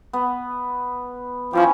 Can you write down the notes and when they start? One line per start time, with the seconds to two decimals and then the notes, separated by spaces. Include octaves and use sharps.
0.13 B3
1.53 F3 C#4 E4 G4